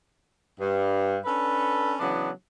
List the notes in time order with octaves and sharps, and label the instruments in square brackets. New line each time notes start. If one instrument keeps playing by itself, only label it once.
[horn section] G2
C#4 D4 A4 B4
C#3 E3 F#3 B3 D4